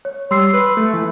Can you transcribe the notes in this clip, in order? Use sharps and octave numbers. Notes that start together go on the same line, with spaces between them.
C#5
G3 C6 E6 C7
B4
A3
E3